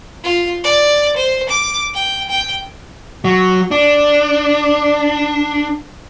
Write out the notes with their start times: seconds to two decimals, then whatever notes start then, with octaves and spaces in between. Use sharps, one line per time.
0.24 F4
0.64 D5
1.16 C5
1.49 D6
1.94 G5
2.30 G5
3.25 F#3
3.71 D4